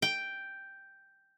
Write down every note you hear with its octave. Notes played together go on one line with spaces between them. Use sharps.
G5